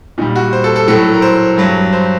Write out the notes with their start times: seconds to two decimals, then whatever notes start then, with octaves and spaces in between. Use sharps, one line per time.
0.18 A#2 D#4
0.21 G3
0.35 F#4
0.53 C5
0.64 A4
0.76 A4
0.88 A2 F#3 A4
1.14 A#4
1.22 C5
1.57 G2 F#3
1.92 C5